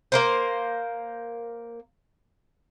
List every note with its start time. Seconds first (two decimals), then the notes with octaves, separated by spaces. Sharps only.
0.12 A#3 A#4 C5